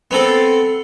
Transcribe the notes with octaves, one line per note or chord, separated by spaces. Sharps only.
B3 C4 A4